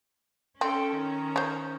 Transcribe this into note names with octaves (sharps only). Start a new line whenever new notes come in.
C4 C#4 A4 G5
D#3 A#5
C5 C#5